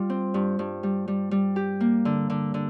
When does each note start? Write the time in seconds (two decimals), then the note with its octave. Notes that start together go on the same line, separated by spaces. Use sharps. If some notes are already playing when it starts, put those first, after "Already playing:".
Already playing: G3 F4
0.10 C4
0.34 G2
0.59 G2
0.83 G3
1.08 G3
1.31 G3
1.56 G4
1.80 A#3
2.05 D3
2.30 D3
2.54 D3